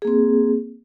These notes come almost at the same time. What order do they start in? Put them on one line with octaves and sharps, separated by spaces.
G#4 A#3 C4